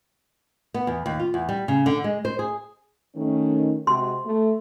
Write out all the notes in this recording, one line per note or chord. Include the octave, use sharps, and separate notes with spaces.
B3
E2
D#2
F4
E2
G3
C#3
D3
G#3
C5
G#4
D#3 A3 C#4
C3 G#3 F#4 C6
A3